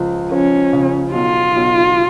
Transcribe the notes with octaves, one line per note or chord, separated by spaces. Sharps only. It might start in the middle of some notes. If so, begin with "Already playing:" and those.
Already playing: C#2 F3
F3 C#4
C#3
B1 F4
B1